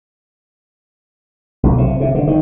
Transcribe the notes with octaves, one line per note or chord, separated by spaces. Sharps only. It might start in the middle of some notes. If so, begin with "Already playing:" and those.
B1
C3
C3
D3
D#3